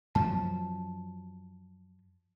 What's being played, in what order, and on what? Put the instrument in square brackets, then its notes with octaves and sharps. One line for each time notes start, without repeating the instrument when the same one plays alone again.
[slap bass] F#2 F3 F#3 [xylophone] A5